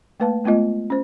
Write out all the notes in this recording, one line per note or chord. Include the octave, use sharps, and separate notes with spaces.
A3 A#3 B4 F5 A5
G#3 A3 B3 F4 D#5
C#4 C5